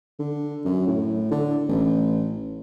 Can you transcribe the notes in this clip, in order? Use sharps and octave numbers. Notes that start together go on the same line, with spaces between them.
D3
F#2
A2
D3
A1